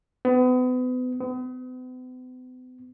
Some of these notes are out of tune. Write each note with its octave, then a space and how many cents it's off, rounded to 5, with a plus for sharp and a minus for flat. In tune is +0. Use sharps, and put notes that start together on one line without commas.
B3 +35
B3 +45